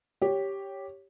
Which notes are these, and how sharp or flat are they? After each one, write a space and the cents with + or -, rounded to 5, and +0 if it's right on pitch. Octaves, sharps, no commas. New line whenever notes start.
G4 +0 C#5 +0